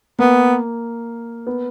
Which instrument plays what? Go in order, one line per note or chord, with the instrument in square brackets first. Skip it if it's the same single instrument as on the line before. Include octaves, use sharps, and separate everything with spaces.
[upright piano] A#3 [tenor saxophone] B3
[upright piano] B3